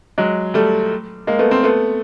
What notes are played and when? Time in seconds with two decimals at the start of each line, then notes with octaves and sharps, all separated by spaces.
0.18 F#3 G#3
0.54 G3 A3
1.27 G#3 A#3
1.39 A3 B3
1.51 A#3 C4
1.63 A3 B3